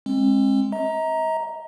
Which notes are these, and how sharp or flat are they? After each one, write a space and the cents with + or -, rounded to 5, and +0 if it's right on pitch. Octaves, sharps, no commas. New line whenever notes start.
G#3 +0 C4 +40
D#5 +45 A#5 +0